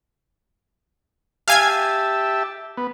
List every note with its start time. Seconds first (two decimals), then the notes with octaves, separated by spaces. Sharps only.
1.48 G4 E5 F5 G#5 A5 G#6
2.77 B3